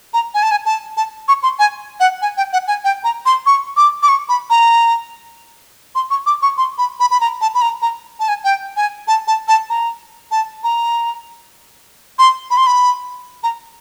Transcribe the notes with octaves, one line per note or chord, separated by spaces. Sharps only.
A#5
G#5
A5
G#5
A5
A5
C#6
C6
G#5
F#5
G#5
G5
F#5
G#5
G5
A#5
C6
C#6
D6
D6
C#6
B5
A#5
C6
C#6
D6
C#6
C6
B5
B5
B5
A#5
A5
B5
A#5
A#5
A5
G#5
G5
G#5
A5
A5
A5
A#5
A5
A#5
C6
B5
C6
B5
A#5